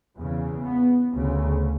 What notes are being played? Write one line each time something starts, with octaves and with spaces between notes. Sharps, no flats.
E2 C#3
B3
D2 C#3